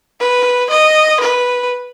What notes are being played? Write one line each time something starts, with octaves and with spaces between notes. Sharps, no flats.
B4
D#5
B4